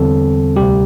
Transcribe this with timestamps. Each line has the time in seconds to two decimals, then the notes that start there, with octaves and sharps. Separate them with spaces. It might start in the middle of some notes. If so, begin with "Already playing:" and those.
Already playing: E2 D3 G3 C4 A4
0.56 D2 C3 G3 G4